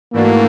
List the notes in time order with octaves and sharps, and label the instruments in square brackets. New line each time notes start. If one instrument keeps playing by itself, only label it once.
[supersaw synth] G#2 E3 A3 D4 F#4 [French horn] A#3